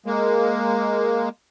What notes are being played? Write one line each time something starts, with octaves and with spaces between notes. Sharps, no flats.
G#3 A#3